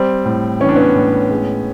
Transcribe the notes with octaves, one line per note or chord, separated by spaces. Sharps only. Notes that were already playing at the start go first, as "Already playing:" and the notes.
Already playing: G3 C4
A2
E3 C#4
D4
B3 C#4
A2
G#3